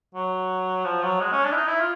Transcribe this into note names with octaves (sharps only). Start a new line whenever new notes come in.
F#3
F3
F#3
G#3
C#4
D4
E4
D#4
E4
F4